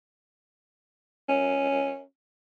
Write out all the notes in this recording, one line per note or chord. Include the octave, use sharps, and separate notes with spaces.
C#4